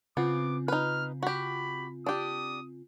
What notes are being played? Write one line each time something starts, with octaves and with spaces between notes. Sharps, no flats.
C#3 B3 C4 F4 D6
D#4 B4 F6
F#4 G4 B5
D4 G4 D#6